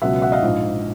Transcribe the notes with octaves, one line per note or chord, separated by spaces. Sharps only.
C#2 B2 F#3 E5 F#5
E5 F#5
D#5 F5
A#1 G#2 F3